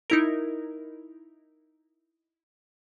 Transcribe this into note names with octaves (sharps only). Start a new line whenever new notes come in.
D#4 E4 A#4